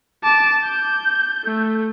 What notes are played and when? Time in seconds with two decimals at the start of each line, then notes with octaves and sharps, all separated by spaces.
0.24 A5 D6
0.64 G6
1.45 A3